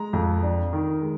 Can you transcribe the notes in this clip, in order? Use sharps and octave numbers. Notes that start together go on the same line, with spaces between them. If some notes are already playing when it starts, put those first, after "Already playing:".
Already playing: G#3 A#5
F2
D4
D#3
G#3